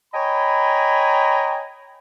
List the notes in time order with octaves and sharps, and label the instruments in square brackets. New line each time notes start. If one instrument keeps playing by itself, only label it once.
[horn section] C#5 D#5 G5 G#5 A#5 B5